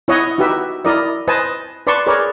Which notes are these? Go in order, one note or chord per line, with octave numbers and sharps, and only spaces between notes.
E4 C#5 D#5 F#5
D#4 F#4 G4 B4 E5
E4 A#4 D5 D#5
B4 C5 D#5 G#5 A5
B4 D5 A5 C6 C#6
G#4 A#4 B4 C#5 D5